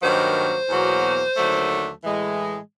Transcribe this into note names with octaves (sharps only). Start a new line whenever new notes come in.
G2 D#3 F#3 A#3 C5
E2 B2 F#3 A#3
D#2 D3 F#3 A3
A2 E3 G#3